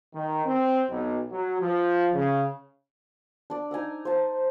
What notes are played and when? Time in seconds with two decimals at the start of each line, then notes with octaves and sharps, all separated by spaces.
0.14 D#3
0.45 C4
0.90 B1
1.32 F#3
1.61 F3
2.14 C#3
3.50 D4 D5
3.71 D#4 G#5 A#5 E6
4.05 C5 A5